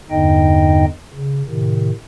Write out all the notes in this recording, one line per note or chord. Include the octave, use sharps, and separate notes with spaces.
E2 G2 D3 D#4 D#5 G5
C#3
A2 C3 D#3